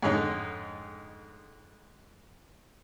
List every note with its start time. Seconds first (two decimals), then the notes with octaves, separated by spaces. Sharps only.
0.02 F2 G#2 D3 G#3 C#4 D#4